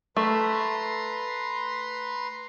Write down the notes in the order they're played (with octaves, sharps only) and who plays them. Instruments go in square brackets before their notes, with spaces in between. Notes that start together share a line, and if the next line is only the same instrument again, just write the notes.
[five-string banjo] A3 [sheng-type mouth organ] B4 A#5 C6